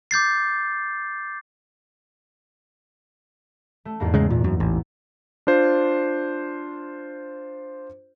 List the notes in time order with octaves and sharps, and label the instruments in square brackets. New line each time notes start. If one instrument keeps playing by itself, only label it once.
[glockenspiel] D6 G6 A6 C7
[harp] A3
E2 G#2 A#3
[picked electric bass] C#3 G#3
A#2
F#2
A1
[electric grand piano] D4 F4 C5